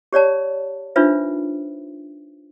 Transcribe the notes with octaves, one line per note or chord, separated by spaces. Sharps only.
G4 C#5 D5 A5
D4 D#4 F4 B4 C5 E5